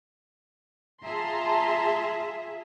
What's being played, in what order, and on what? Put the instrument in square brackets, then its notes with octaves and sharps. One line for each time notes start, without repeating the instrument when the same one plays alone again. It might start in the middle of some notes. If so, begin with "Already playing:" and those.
[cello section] F4 G#4 E5 [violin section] A5 A#5 C6